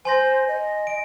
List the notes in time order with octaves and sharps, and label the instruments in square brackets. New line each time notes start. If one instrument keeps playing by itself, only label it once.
[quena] C5 [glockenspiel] G#5 C6 A#6
[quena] D#5
[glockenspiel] D7